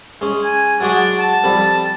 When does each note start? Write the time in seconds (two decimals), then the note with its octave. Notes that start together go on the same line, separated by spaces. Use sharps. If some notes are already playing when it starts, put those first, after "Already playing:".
0.21 G#3 C#4
0.44 G#5
0.80 F#3 G#3 D4 F#4
1.19 A5
1.44 F2 G3 B5